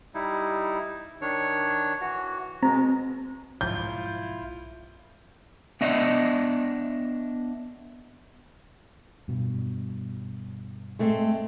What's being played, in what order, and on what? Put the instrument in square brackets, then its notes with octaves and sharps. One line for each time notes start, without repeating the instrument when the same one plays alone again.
[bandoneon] G3 D#4 E4
D#3 D4 C#5
E3 F#4
[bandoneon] B2 G#3 [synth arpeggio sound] C4 A#5
[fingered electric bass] B1 G#2 F3 [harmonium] E4 F4 [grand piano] G6
[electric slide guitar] B3 D4 D#5 E5
[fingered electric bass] G2 B2
[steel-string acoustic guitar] G#3 A3 C4